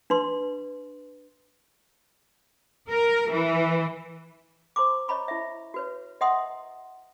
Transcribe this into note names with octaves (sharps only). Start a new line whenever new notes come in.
D4 B4 C6
A#4
E3
C5 A#5 C6 D6
C#5 D#5 A#5 B5 C#6
E4 E5
F#4 B4 C#5
D#5 E5 F#5 A#5 C6 D#6